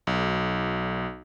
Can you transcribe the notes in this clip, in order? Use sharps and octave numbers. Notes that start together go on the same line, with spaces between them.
B1